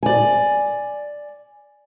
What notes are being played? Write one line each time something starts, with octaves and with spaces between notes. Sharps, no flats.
D5 G#5